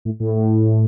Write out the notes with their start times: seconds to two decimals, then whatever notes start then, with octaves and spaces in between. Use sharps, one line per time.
0.05 A2
0.20 A2
0.36 A2